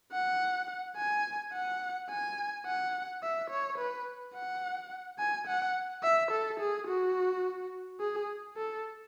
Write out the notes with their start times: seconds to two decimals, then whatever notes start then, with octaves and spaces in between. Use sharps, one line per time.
0.12 F#5
0.97 G#5
1.53 F#5
2.09 G#5
2.66 F#5
3.22 E5
3.50 C#5
3.78 B4
4.34 F#5
5.19 G#5
5.47 F#5
6.03 E5
6.31 A4
6.60 G#4
6.87 F#4
8.00 G#4
8.57 A4